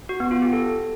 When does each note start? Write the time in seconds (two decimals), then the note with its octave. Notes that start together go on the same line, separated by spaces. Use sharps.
0.09 F#4
0.20 B3
0.31 F4
0.42 G4
0.53 A4